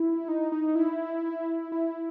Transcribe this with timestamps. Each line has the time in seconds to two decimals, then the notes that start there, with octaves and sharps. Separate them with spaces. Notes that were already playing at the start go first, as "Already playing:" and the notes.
Already playing: E4
0.28 D#4
0.52 D#4
0.75 E4
1.72 E4